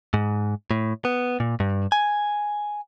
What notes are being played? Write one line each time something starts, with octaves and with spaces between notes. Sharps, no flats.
G#2
A2
B3
A#2
G2
G#5